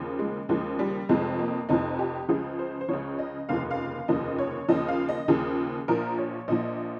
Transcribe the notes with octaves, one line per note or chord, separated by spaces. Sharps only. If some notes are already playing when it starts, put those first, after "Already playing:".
Already playing: D#2 C#3 F3
G#3
D#2 C#3 F3 G#3
G3
F1 F2 C3 F3 G#3
A#3
F1 F2 C3 F3 D#4
G4
C#2 C#3 F3 G#4
C5
C5
C#2 C#3 F3 C#5
D#5
F1 D#2 C#3 F3 F5
F5
F1 D#2 C#3 F3 D#5
C#5
D#2 C#3 F3 D#5
F5
D#5
D#2 C#3 F3 G#4
A#1 A#2 F3 A#4
C#5
A#1 A#2 F3 D#5